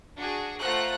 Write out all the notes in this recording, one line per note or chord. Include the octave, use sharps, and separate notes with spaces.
D4 F#4 G#4
A3 F4 C5 F#5 A#5 F#6